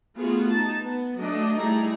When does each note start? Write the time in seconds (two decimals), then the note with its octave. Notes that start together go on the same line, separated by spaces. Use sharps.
0.17 A3 B3 F4 F#4 G#4
0.50 D#4 A5
0.82 B3
1.18 F#3 A3 D4 D#5
1.56 G3 A3 D#4 E4 G#4 A#5